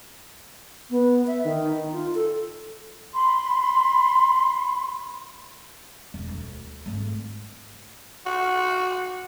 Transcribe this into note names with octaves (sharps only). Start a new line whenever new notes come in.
B3
E5
D#3
D#4
F4
A4
B5 C6
E1
D2
G#1 A3
F#4